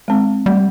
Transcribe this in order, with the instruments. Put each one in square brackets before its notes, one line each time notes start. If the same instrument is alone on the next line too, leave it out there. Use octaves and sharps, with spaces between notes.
[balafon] G#3 C4
[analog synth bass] G3 [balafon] A3